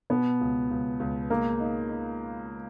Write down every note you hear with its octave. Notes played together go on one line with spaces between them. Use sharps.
B2 B3
C#2
C#2
C#2
G#3 A#3
D#4
D#4